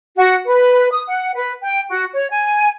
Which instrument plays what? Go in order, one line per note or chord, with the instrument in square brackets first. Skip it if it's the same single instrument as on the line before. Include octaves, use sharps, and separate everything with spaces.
[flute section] F#4
B4
D#6
F#5
B4
G5
F#4
C#5
G#5